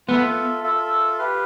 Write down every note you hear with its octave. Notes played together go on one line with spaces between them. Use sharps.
B3 F4 A4 E5
F4 A4 E5
G4 B4 F5